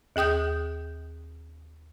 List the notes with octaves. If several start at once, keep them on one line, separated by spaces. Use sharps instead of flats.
D#2 G#4 G5 D#6 G6